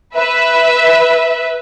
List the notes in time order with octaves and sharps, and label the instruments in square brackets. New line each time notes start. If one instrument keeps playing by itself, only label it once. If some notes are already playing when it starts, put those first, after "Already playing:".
[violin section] B4 E5